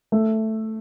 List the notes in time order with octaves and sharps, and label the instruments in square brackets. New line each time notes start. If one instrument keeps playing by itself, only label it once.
[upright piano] A3